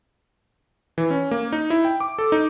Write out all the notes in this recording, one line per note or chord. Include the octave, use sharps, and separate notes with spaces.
E3
C#4
A#3
D#4
E4
G5
D6
A4
D#4